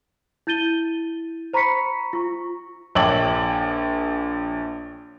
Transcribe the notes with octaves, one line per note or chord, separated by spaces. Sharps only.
E4 G6 A6 D#7 G7
C5 A#5 B5 C#6 B6 C#7
F4 C#6
A#1 C#5 G5 D6 F#7